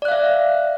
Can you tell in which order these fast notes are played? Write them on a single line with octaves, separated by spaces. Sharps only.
D5 F#6 F5 E5